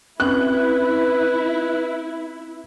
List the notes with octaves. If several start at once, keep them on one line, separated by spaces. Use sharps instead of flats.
C4 C#4 E4 B4 F#6